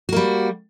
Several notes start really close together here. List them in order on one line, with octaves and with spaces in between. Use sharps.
F#4 A#3 G3